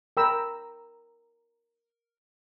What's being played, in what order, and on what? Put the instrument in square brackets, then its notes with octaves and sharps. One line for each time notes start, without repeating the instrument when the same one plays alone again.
[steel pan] A#4 G5 A#5 B5 E6